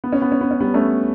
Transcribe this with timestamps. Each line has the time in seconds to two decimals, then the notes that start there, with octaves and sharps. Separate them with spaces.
0.04 B3
0.12 C#4
0.22 B3
0.32 C#4
0.41 B3
0.51 C#4
0.61 G3 B3
0.74 A3 C#4